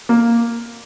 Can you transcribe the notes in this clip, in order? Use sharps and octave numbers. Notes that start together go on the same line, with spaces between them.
A#3